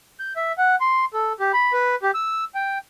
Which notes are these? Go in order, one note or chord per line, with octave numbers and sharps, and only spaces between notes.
G6
E5
F#5
C6
A4
G4
B5
B4
G4
E6
G5